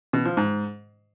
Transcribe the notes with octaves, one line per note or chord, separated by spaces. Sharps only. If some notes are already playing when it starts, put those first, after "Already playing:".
B2
F3
G#2